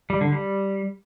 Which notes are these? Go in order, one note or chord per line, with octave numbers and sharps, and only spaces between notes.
G3
D3
G3